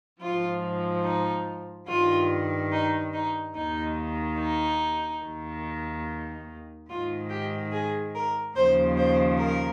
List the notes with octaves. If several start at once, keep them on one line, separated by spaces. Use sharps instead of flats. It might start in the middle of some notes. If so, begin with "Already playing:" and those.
G#2 F3 F4
D#4
G2 D#3 F4
D#4
D#4
D#2 D#3 D#4
D#4
D#2 D#3
G#2 D#3 F4
G4
G#4
A#4
D#2 C#3 F3 C5
C5
A#4